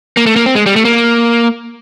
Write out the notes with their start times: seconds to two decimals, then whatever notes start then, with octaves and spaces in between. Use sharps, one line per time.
0.17 A#3
0.26 A3
0.36 A#3
0.46 C4
0.55 G#3
0.66 G3
0.76 A3
0.85 A#3